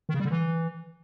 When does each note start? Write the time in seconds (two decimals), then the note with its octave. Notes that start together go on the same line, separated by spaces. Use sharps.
0.09 D#3
0.14 C#3
0.20 G3
0.25 D3
0.31 E3